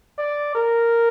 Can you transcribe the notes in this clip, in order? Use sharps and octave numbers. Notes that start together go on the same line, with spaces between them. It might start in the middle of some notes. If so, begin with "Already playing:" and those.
D5
A#4